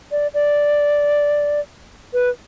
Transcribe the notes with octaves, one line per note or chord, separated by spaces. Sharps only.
D5
D5
B4